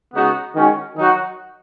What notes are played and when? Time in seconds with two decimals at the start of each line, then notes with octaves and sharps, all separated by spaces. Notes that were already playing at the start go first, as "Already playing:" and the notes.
0.14 C#3 G#3 B3 D#4 F#4
0.55 D#3 G#3 C#4 F#4
0.96 D#3 F#3 D#4 F#4